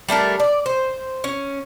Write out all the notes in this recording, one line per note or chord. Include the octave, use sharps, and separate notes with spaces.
G3 A3 D4 A#4
D5
C5
C#4